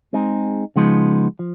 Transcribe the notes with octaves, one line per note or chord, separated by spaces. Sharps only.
G#3 C4 D#4 G#4
C#3 F3 G#3 B3 D#4
F3